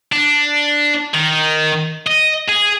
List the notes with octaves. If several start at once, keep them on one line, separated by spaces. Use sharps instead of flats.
D4
D#3
D#5
G#4